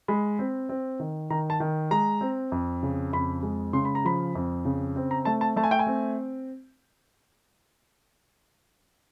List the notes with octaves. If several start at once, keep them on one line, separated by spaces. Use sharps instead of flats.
G#3 B5
C4
C4
D#3
D#3 A#5
A5
D#3
G#3 A#5
C4
F2
C#3
F2 B5
G#3
C#3 C6
B5
A#5
F3 B5
F2
C#3
C4
A#5
A3 A5
A5
A3 A5
G#5
G5
G#5
C4